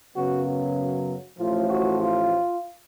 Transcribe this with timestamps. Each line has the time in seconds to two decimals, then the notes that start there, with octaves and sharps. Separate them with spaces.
0.16 F#2 C#3 F#3 B3 F#4
1.39 A1 A2 F3 F4
1.69 F#4
2.00 F4